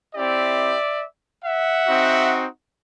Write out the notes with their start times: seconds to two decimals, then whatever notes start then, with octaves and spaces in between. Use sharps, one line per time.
0.15 C4 E4 G4 D5 E5
1.44 E5 F#5
1.86 C4 D#4 F#4